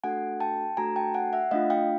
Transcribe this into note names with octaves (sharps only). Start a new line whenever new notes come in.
A3 D4 F#4 A4 F#5 G#5
G5 A5
A3 D4 F#4 A4 G#5 A#5
G5 A5
F#5 G#5
E5 F#5
A3 D4 F4 D#5 F5
F5 G5